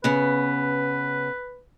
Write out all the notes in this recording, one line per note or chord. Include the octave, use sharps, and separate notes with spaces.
C#3 B3 B4